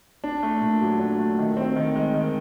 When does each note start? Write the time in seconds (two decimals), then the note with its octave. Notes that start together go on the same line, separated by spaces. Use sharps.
0.24 D4
0.43 A3
0.61 A#2
0.81 F#3
0.99 D4
1.18 A3
1.39 D#3
1.57 C4
1.76 D#3
1.95 G#3
2.14 D#3